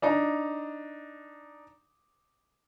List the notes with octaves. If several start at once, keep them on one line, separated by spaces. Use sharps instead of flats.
D4 D#4 A#5